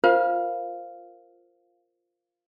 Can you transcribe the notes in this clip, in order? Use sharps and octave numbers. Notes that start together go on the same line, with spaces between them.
F4 A#4 C5 F5